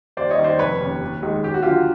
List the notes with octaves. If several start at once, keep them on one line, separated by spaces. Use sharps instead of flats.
D#2 C5 D5
C#5 D#5
D#3 G3
C5 D5
F1 B4 C#5
D#2 C#3
D#2
D#3 G#3
D#2 G4
F#4
D3 F#3 F4 G4